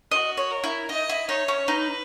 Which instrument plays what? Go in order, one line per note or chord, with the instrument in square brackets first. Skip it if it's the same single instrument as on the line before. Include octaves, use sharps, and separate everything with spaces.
[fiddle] F#4 [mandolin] D#5
[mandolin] C#5
[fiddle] A#4
[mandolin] E4
[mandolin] D#4 [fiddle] D#5
[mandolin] E4
[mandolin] D#4 [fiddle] C#5
[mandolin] C#4
[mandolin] D#4 [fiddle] B4